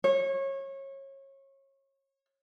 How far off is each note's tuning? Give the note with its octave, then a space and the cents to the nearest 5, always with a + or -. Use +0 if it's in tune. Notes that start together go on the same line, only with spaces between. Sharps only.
C#5 -25